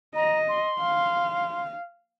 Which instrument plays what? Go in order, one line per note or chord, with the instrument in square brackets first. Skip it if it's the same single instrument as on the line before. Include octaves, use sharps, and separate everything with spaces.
[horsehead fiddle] D#5 [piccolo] A#5
[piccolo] C6
[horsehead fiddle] F5